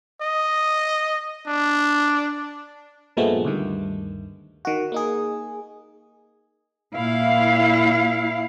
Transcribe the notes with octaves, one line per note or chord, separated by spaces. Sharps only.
D#5
D4
G2 A#2 F3 G#3 A3 B3
D2 G2 D#3
D#3 F#4
A#3 D#4 G#4
A#2 E4 F5